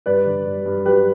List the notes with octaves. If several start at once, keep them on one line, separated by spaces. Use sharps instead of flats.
G2 B4 D5
D3
G2
G2
F#3 G4 B4